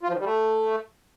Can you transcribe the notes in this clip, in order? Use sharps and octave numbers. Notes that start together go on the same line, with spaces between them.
F4
F3
D#3
G3
A3